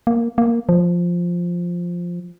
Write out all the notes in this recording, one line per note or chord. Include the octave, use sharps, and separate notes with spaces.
A#3
A#3
F3